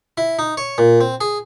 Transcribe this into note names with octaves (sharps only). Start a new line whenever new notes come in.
E4
D#4
C#5
A#2
C4
G#4